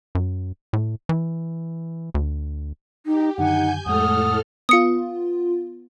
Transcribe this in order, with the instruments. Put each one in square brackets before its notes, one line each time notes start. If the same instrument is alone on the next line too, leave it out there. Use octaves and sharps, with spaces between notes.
[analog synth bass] F#2
A2
E3
D2
[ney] D#4 [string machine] G4
[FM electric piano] F#2 D3 D#3 [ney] D#4 [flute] F#5 [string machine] G#5 G6
[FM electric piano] F2 G#3 [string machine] A2 A4 F6 [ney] F#5 [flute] D#6
[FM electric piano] B3 F4 [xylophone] D#6 C#7